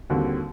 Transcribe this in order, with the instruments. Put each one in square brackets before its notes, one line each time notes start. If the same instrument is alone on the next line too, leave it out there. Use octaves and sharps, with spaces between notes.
[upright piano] D#2 D3 G3 C4 F#4